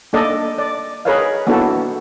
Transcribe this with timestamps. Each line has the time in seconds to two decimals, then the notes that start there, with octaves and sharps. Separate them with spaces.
0.13 A#3 D4 A4 D5 D#5
0.58 D5
1.05 G#4 A#4 B4 C#5 D#5 F5
1.47 A#3 B3 D4 E4 F#4 A4